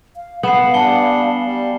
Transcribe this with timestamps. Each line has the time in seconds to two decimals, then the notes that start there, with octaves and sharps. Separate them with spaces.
0.16 F5
0.43 B3 C7 E7 F#7
0.74 G3 D4 G#5 C#7 G7
1.46 G3